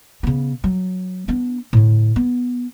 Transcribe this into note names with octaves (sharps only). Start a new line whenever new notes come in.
C#3 B3
F#3
B3 D4
A2 D3
B3